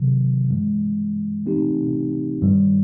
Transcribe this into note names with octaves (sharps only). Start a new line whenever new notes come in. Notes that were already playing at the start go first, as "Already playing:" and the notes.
Already playing: C3 D#3 F#3
G2 E3 G#3
E3 A3 C4 D#4 G4
G2 D#3 G3